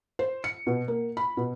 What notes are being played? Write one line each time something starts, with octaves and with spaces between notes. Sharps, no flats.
C5
C#7
B2
A#3
B5
B2